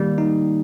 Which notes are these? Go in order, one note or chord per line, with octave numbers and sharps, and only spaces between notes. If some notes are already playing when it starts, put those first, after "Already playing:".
Already playing: D#3 G3 A#3
D#4